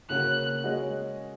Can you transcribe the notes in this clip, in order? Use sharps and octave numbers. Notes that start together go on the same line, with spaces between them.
C#3 A#3 C#4 F#4 A#4 F#6
G#3 C#4 F#4 D#5